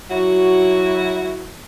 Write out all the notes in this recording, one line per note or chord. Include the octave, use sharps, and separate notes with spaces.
F#3 E4 F#4